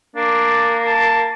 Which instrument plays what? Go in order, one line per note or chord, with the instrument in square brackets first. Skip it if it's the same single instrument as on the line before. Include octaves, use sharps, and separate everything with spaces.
[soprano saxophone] A#3 [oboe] D4
[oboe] A5